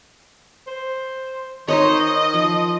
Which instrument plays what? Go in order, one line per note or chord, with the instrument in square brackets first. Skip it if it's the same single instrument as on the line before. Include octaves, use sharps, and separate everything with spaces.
[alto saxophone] C5
[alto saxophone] D#3 [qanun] D#4 C5 C#5 [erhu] D#5
[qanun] F3